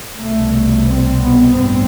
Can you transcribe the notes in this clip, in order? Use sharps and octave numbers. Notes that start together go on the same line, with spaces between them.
C2 B2 A3
C4
B3
A1 G2 C4